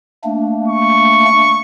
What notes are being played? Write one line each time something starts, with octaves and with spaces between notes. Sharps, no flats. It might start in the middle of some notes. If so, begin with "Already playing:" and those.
A3 A#3 D4
C#6